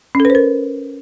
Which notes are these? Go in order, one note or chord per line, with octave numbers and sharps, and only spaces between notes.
C#4
A4
B4
C5
A#4